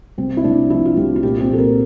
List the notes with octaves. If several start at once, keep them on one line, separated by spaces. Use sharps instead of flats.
C2 C4
E4
C2 D4
F3 E4
F4
C2 G4
F4
A#2 G4
C4
A#1 A4
A#4